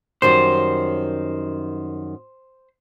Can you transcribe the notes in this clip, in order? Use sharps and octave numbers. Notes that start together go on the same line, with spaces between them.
F#2 D#3 G3 C5